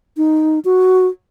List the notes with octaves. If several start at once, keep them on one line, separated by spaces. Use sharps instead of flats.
D#4
F#4